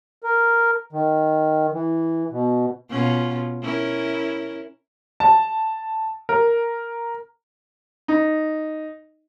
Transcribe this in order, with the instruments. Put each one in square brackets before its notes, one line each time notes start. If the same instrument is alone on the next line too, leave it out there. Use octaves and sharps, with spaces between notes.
[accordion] A#4
D#3
E3
B2
[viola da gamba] B2 C#4 F4
C#4 E4 A#4
[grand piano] A5
A#4
[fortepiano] D#4